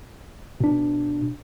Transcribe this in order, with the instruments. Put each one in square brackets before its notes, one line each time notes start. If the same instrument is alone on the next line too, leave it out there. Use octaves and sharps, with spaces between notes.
[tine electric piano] B2 D4